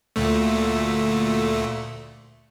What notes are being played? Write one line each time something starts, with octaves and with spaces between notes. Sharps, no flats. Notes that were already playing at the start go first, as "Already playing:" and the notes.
D2 A#2 A3